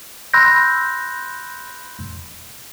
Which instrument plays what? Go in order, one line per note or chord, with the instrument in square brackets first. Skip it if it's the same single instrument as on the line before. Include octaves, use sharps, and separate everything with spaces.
[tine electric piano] B5 C6 E6 F#6 G6 A#6